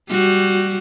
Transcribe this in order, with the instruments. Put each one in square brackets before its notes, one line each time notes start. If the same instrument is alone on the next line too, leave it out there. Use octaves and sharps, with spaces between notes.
[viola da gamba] G3 F#4